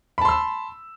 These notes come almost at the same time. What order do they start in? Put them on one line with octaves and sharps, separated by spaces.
B5 A5 C6 E6